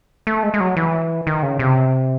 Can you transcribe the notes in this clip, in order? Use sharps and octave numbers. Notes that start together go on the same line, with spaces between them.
A3
G#3
G#3
F#3
E3
D#3
C#3
C3